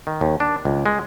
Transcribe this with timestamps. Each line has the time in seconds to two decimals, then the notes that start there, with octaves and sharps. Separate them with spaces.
0.07 D#3
0.21 D#2
0.40 D4
0.65 C#2
0.86 G#3